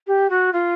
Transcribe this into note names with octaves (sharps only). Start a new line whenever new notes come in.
G4
F#4
F4